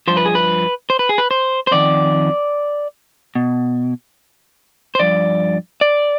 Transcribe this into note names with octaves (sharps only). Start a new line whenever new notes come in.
G2 F3 C5
B4
G#4
B4
C5
B4
G#4
B4
C5
C5
F2 D#3 D5
B2
C5
G2 F3 D5
D5